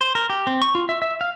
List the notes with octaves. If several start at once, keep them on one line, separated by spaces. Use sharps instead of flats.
C5
A#4
G4
C4
C#6
F4
E5
E5
F5